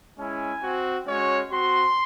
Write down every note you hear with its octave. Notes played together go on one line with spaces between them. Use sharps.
G#3 C#4 E4 G#5
C4 F#4
G#3 C#4 F#4 C#5
C4 F#4 C6